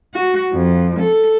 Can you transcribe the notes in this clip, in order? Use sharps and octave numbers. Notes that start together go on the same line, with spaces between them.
F#4
F2
A4